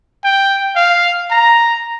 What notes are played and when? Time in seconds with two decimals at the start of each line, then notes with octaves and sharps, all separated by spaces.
0.24 G5
0.76 F5
1.31 A#5